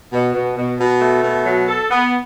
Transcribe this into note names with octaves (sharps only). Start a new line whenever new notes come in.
B2
B2
B2
B2
A3
B2
F#3
A4
B3